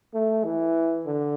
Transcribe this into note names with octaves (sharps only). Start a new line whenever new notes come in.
A3
E3
D3